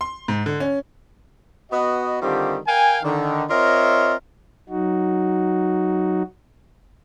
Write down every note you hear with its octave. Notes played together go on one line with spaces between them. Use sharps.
C6
G#2
D3
C#4
B3 F#4 D#5
D3 D#3 G3 C4 F4 G4
A#4 F5 G5 G#5
D3 D#3
C4 F4 A#4 C#5 D#5 E5
F#3 D#4 F#4